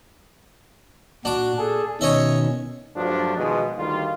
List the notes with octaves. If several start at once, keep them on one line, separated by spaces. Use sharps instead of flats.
A#2 D4 F#4 D6
G#4 A4
B2 D#3 C#4 C#5 D#5 E5
G2 F3 F#3 A3 D4
B2 D#3 F3 G#3
D2 D#3 G3 F4